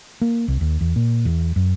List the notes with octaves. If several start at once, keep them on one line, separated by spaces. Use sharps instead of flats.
A#3
C2
D#2
E2
A#2
E2
F#2